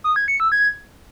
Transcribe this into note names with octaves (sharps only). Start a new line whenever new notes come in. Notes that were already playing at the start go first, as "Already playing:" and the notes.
D#6
G#6
C#7
E6
G#6